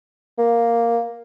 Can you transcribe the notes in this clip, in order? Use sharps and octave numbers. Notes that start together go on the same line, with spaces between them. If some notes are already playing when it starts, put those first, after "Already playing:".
A#3